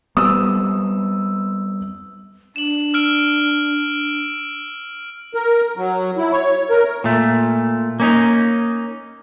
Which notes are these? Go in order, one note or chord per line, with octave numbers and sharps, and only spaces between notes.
G3 B3 C4 D#6 E6
D4 E7 F#7
E6 F6 D7
A#4
F#3
E4
C#5
A#4
A#2 A3
A#3 C#4 D#4